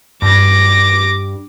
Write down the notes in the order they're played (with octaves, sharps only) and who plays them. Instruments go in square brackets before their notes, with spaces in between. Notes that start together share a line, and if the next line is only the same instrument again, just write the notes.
[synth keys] G2 [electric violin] D6 A#6